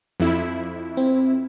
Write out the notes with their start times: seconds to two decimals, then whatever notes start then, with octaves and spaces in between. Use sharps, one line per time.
0.20 F2 E4
0.97 C4